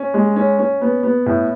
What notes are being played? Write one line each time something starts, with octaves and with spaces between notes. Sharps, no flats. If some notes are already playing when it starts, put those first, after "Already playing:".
Already playing: C#4
G#3
C#4
C#4
B3
B3
A2